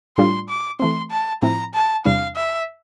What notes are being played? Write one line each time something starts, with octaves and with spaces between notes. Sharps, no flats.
A2 G3 D4 F4 C6
D6
E3 A3 C4 C6
A5
A2 F3 C4 E4 A#5
A5
E2 C3 E3 G3 D4 F5
E5